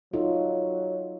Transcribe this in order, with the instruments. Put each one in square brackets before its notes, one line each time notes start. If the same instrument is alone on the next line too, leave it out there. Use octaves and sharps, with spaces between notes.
[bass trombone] F#3 [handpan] D#4 F4 A4